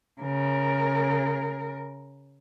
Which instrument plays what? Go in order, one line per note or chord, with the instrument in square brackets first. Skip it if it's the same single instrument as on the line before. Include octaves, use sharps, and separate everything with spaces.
[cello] C#3 A#4